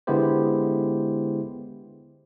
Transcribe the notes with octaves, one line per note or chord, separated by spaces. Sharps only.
D3 G#3 B3 E4 G4 C5